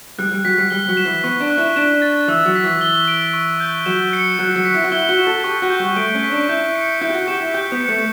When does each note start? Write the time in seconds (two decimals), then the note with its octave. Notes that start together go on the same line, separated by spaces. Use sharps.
0.19 G3 F#6
0.32 G3
0.45 F#3 B6
0.58 G3
0.70 G3 G7
0.89 F#3
0.97 E7
1.05 E3
1.24 B3 C#6
1.40 D4
1.50 F#6
1.58 E4
1.76 D4 E7
2.02 A6
2.28 E3 E6
2.46 F#3
2.55 B6
2.64 E3
2.81 G7
3.08 D7
3.33 C#6
3.60 G6
3.86 F#3 E7
4.13 C#7
4.39 F#3 F#6
4.56 F#3
4.65 B6
4.74 E4
4.84 F#4
4.92 E4 G7
5.09 F#4
5.18 E7
5.27 A4
5.44 G4 C#6
5.62 F#4
5.70 G6
5.79 G3
5.96 A3 D7
6.15 C#4
6.23 B6
6.31 D4
6.49 E4 G6
6.75 C#7
7.01 E4 G6
7.10 G4
7.14 F#4
7.27 G4 E7
7.41 E4
7.54 G4 G6
7.72 B3
7.81 C#7
7.89 A3